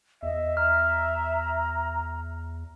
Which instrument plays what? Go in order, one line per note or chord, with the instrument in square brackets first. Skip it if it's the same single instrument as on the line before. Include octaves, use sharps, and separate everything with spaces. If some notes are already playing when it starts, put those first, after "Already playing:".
[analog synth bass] E2 [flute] D#5 [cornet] E5
[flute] A#5 [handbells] F6